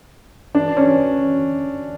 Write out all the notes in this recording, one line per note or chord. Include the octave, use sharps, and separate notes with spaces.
D4
C#4